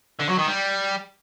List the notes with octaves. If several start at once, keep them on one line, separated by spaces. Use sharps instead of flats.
D3
F#3
D#3
G3